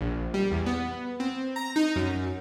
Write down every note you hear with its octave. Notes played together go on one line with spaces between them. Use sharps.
A#1
G3
E2
B3
C4
A#5
D#4
F#2